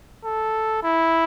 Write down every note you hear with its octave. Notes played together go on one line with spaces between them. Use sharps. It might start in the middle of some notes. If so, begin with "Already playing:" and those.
A4
E4